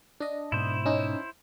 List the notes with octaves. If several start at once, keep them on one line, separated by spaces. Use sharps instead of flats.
D4 D#5
G#2 B2 E4 C5
C#4 D#4